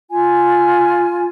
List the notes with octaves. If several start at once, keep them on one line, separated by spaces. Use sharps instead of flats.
F4 G#5